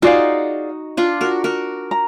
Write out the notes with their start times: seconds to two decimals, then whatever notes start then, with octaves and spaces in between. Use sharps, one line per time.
0.02 D#4 F4 F#4 G#4 D5 F5
0.97 D4 F4
1.21 F#4 A#4
1.44 F#4 A#4
1.91 A#5